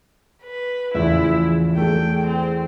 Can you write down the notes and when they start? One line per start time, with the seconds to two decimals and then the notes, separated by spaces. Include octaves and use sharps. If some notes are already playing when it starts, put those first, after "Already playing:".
0.44 B4
0.94 E2 A2 C#3 F3 E4 E5 E7
1.78 A3 G#4 G5
2.27 C4